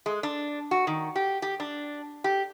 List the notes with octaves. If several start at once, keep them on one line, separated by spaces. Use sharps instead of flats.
G#3
D4
F#4
D#3
G4
G4
D4
G4